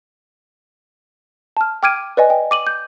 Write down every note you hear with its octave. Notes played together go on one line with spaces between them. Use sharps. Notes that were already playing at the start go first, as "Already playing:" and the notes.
A5 F6
G5 D6 F6 G#6 D7 D#7
B4 D5 D#5 G#5
G5
D6 D#7 F#7
G6